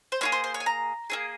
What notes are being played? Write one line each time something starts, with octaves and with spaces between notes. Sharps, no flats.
C5
A#3 F4 G#4 C#5
C5
C5
C#5
G#5
A#5
A#3 C#4 G#4